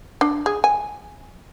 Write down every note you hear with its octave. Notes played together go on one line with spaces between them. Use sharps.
D4
G#4
G#5